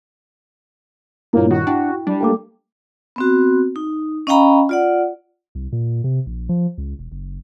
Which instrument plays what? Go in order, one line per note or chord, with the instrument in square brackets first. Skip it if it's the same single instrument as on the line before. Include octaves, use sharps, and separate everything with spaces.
[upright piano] G2 A#2 [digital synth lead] A#3 [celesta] E4 C#5
[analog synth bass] D#3 [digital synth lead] F#4
[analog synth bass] D4 [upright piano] E4 [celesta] G5
[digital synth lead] G3 [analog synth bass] D4
[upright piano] A3 A#3 A4 [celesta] G5 D6
[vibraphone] B3 C4 F#4
D#4
C#4 D#5 F5 G5 A#5 B5
F4 D5 F#5
[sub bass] C2
A#2
C3
A#1
F3
C#2
E1
F#1